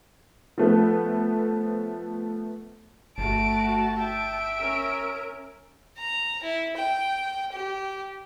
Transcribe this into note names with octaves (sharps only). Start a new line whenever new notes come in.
F3 A3 B3
G1 A3 F#4 A5 D7
E5 G5 D7
C#4 A#4
A#5
E4
G5
G4